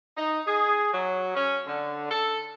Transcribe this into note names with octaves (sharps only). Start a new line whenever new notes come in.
D#4
G#4
F#3
C#4
D3
A4